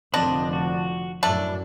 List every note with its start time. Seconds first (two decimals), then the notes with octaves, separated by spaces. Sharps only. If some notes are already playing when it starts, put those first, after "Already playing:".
0.14 F1 D3 F3 C4 D4 D#5 B5
0.53 F#4
1.23 F#2 A2 A3 D4 B5